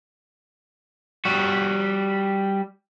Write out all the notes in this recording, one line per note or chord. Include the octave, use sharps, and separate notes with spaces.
G3 F#4